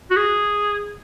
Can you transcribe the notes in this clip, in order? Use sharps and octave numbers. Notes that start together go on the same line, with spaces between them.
F#4
G#4